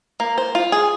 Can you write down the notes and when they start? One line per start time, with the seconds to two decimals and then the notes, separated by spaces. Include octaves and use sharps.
0.20 A#3
0.38 C5
0.55 F4
0.72 G#4